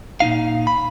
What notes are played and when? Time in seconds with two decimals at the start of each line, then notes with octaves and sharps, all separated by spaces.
0.20 A#2 C#3 D#4 F5
0.67 B5